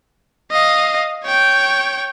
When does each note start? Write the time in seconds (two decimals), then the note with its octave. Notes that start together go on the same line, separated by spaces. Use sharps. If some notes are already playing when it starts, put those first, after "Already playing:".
0.52 D#5 F5
1.24 C#5 G5